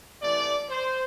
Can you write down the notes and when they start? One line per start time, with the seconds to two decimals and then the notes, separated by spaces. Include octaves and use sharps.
0.22 C3 E3 A3 D5
0.70 C5